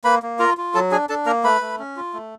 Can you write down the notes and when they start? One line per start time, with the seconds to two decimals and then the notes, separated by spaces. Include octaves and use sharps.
0.04 A#3 B4 B5
0.23 A#3
0.39 F4 A#4 A#5
0.57 F4
0.74 F#3 A4 A5
0.91 D4 G#4 G#5
1.09 D4 A4 A5
1.26 A#3 A#4 A#5
1.44 A3 B4 B5
1.61 A3
1.79 C#4
1.97 F4
2.14 A3